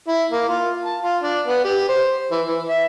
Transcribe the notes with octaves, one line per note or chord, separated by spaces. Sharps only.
E4
A#3
F4
A5
F4
D4
B3
G4
C5
E3
E3
E5